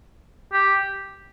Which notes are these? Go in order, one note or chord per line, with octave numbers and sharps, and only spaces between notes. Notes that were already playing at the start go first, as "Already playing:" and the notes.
G4